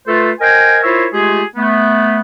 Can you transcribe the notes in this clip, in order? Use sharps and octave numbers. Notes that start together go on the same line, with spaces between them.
A3 F4 A4 B4 C5
A#4 C5 D#5 G5 G#5
E4 F4 A#4 C5 C#5 E5
G#3 A3 F4 G4 G#4
A3 B3